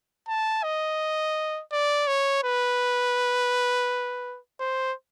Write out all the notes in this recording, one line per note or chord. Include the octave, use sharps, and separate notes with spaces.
A5
D#5
D5
C#5
B4
C5